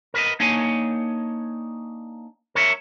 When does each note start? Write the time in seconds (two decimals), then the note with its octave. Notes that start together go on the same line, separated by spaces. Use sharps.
0.14 A#4 B4 D#5
0.40 A#3 D4 D#4 C#5 G#5
2.55 A#4 C#5 D5 E5